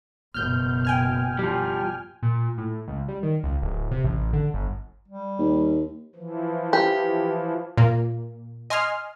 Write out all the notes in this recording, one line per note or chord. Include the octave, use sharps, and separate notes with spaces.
F#1 B2 F6 G6
G5 G#5 F6
F3 G3
A#2
A2
C#2
G3
D#3
C#2
D1
C3
A1
D3
G1
G3
D#2
E3 F3
G4
A#2 A#3
D#5 G#5 C6 D#6 F6 C7